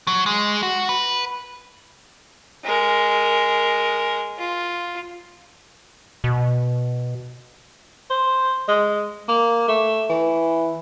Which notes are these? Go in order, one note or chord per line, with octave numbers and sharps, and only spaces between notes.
F#3
G#3
F#4
B4
G#3 A#4
F4
B2
C5
G#3
A#3
A3
E3